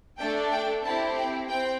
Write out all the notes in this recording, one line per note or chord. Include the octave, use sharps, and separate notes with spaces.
A3 D4 A4 G5
G5
C4 E4 G4 A5
G5
C4 G5